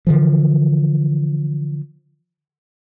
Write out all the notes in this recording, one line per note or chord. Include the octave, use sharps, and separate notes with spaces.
D3 E3 F3